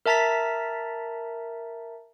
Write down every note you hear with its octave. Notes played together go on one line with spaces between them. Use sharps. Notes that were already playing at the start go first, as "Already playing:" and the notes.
A#4 E5 A5 A#5 A6 B6